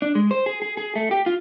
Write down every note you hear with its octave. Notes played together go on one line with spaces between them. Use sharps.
D4
G#3
C5
G#4
G#4
G#4
A3
G4
F4